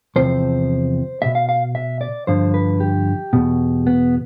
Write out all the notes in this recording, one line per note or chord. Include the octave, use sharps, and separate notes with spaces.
E2 C3 F3 C5
C2 B2 E5
F5
F5
E5
D5
G2 D3 F3 C5
B4
G4
E2 B2
B3